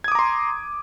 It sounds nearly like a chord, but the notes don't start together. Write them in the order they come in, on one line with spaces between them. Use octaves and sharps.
G#6 D#6 D6 A#5 C6